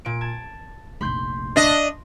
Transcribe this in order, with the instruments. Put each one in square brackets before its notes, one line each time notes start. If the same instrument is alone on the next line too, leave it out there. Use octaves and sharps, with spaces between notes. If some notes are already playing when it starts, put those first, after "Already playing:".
[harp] A#2 D7
A5 G#6
[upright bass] F1 A#1 [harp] B5 C6 G6
[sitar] D4 D#5